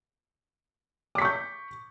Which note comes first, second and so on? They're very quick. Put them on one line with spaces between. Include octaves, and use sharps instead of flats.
D6 B6 C#6 G6